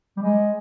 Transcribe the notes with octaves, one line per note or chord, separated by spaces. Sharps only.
G3
G#3